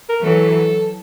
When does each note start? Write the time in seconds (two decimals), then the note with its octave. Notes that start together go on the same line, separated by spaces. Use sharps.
0.09 A#4
0.24 E3 F#3 A4